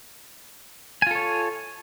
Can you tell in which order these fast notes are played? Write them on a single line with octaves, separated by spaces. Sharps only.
G#5 F4 A4 C#5